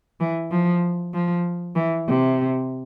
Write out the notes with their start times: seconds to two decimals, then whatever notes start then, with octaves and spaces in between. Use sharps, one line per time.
0.20 E3
0.51 F3
1.13 F3
1.75 E3
2.07 C3